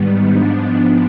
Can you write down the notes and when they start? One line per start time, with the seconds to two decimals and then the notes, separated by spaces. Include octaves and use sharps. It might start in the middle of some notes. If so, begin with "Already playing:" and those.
Already playing: G#2 D#3 G3 B3
0.31 G#2 F3 B3 D4